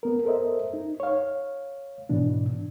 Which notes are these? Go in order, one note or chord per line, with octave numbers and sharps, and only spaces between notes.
B3 A#4
A4 A#4 C5 D#5 E5
D#4
C#5 F5
G#2 B2 E3 D4